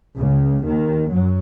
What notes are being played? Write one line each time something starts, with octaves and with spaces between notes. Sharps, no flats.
C#2 C#3
D#2 D#3
F#2 F#3